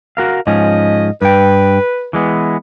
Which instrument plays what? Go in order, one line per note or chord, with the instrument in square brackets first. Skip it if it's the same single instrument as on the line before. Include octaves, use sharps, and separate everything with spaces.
[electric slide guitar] F#4 A#4 F5
[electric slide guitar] G#2 F3 C#4 [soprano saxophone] D#5
[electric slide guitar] G2 G5 [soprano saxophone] B4
[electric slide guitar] E3 G#3 B3